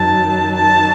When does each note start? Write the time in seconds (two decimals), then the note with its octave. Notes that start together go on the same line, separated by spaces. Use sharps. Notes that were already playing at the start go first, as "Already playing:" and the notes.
Already playing: F#2 D#3 F#3 A5
0.56 A5